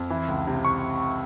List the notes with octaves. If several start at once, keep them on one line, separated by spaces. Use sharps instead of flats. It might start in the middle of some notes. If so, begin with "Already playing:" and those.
Already playing: F2
E3
C#2
C3
C#6